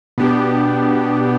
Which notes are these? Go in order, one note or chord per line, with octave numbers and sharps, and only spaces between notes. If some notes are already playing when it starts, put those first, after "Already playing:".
B2 B3 D4 G4